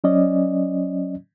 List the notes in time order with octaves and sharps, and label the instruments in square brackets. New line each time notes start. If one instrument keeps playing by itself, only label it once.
[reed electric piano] F#3 C#4 D5 D#5